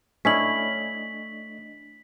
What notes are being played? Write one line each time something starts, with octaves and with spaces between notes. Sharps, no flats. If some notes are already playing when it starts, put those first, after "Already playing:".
A3 C#4 D4 E4 D#5 B6 F#7